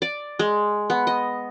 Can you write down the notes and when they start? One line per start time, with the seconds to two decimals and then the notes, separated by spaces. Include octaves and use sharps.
0.02 D5
0.39 G#3
0.90 B3
1.07 D#5